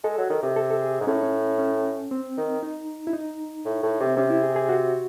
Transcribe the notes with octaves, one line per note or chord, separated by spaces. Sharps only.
G#3 A4
F#3
D#3
C3
A4
A4
G#4
G#2
A2 C#4
D#4
C#4
C#4
C4
D#3
D#4
E4
D#4
A2
A2
C3
C4
C3 C#4
E4
G#4
G#4
F#4